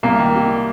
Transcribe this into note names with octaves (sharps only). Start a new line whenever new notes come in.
C2 A#3
D#3
C3